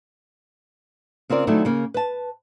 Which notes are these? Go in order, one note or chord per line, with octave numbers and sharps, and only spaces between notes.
C#3 C4 F4 A#4 D5
D#3 F#3 A3 C4 D4 E4
C#3 A#3
B4 A5